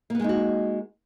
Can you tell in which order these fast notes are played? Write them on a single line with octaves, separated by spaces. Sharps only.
A#3 B3 G#3 D#4 F#4